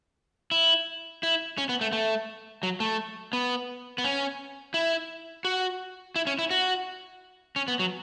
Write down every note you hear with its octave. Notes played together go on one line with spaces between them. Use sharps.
E4
E4
C#4
B3
A3
A3
F#3
A3
B3
B3
C#4
E4
F#4
E4
C#4
E4
F#4
C#4
B3
F#3